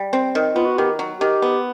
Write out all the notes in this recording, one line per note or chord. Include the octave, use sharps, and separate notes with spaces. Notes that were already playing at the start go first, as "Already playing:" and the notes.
Already playing: G3
C4
D#3
B3 F4
F#4
D#3 G4
F#3
D#3 G4
B3